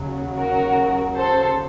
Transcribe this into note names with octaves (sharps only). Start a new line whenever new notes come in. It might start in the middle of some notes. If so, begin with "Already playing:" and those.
Already playing: D#2 C#3 F#3
F#4 A#4
A4 C5